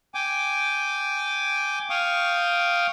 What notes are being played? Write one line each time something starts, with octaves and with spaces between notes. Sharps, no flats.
G5 G#5 D6
F5 G5 C#6 D#6